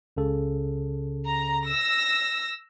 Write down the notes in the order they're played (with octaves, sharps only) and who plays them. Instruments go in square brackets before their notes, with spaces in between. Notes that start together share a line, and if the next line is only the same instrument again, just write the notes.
[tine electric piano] C#2 C#3 A4
[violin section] A#5
E6 A#6